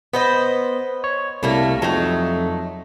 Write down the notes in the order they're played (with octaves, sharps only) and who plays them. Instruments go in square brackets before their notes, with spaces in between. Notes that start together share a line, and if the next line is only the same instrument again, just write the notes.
[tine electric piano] B3 [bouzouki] B4 C5 D#5
[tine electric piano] C#5
[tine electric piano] C2 [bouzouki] G3 A3 A#3
[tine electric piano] F2 [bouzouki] F#3 A3 D#4